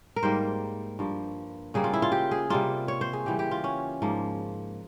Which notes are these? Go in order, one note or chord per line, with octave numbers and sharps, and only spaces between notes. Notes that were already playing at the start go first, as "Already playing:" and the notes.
A#4
G#2 G3 A#3 C5
G2 F3 A#3
C#3 G3 A#3 G#4
F4
E4
F4
G4
G#4
C3 G3 A#3 F4
C#5
C5
G#4
C#3 E3 G3 G4
G4
F4
C#4
G#2 F3 A#3